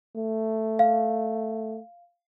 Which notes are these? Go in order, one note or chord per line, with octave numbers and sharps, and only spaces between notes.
A3
F5